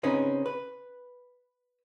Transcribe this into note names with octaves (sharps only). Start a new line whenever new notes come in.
C#3 C4 C#4 D#4 B4
B4